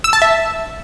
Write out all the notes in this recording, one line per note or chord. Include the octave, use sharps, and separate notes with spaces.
E6
A5
E5